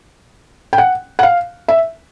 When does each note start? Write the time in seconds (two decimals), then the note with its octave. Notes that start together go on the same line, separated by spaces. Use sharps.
0.73 G5
0.78 F#5
1.19 F#5
1.23 F5
1.68 E5